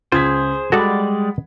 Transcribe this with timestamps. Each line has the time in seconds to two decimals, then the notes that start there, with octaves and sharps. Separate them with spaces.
0.12 C#2 F4 G#4 C5 G#6 B6
0.72 G3 G#3 F#4 A4 D5 F#5 B5